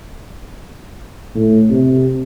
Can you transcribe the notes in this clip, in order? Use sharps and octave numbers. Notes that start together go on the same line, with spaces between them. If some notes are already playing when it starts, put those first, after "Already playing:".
A2
C3